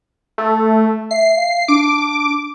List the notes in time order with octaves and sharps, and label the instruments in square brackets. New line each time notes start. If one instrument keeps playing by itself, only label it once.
[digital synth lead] A3
[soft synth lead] E5 [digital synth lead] C7
[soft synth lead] F5
[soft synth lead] D4 [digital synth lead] D6